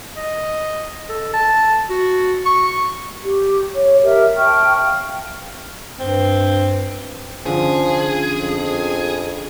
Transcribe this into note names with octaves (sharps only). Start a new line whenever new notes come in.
D#5
A4
A5
F#4
C#6
G4
C#5
G4 A#4 D#5 E5
G5 A5 C#6 F6
F5
G2 C4
D3 F3 C#4 G#4
F2